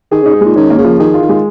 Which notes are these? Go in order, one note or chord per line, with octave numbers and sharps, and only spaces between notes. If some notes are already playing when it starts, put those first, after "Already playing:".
D#3 G#4
C#3 D#4
G#2
A#2 G#3
D#3 C#4
A#3
C#3
F3
D#3 G#4
F4
D#3
G#3